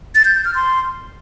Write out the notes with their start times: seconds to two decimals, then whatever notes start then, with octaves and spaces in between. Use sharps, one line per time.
0.15 A6
0.25 G6
0.35 G6
0.45 F6
0.55 C6